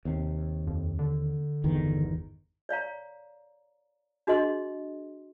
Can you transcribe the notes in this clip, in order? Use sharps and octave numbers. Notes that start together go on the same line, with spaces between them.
D#2 C3
F2
D3
G1 E2 D#3
C#5 D5 F5 A#5
D4 F#4 G#4 D#5 C6